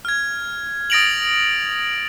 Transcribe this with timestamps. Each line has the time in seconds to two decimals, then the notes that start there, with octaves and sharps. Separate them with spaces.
0.05 F6 G#6
0.90 D#6 A6 A#6 D7 F7 F#7